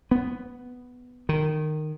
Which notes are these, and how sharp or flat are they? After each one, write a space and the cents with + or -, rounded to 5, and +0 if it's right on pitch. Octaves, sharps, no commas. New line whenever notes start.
B3 +5
D#3 -15